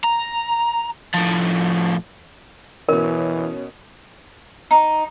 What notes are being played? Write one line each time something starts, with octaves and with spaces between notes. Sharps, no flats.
A#5
A2 F3
B2 E3 C#4 A#4
D#4